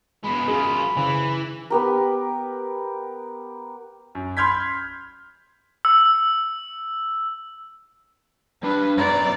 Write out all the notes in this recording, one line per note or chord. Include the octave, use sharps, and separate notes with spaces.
B2 G#3 B5
F#2 F4 G#4
C#3 E3
B3 G4 A#4
F#2
B5 C6 F6 G6 G#6 B6
E6
G3 D4 B4
F#2 B2 D5 A#5